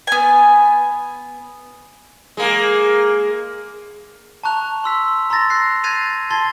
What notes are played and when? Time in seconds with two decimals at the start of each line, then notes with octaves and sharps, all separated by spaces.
0.07 B3 G#5
2.37 G#3 A#3
4.43 A5 A#5 C#6 F#6 F7
4.84 C6 E6 B6
5.30 A#5 C6 E6 A6 A#6
5.50 F#6 C7
5.84 F#6 G#6 A6 C7 D#7 F7
6.30 A5 C6 G#6 A6 C7 G7